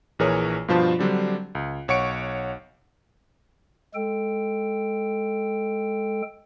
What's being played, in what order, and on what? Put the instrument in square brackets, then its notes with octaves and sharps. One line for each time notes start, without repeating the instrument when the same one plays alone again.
[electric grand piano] A#1 E3 G#4 A#4 C#5 D#6
G2 B2 F3 F4 C5 A5
D3 F#3 G3 C4 D4
C#2
B1 C#5 F#5 C#6 C#7 D7
[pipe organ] G#3 A4 G5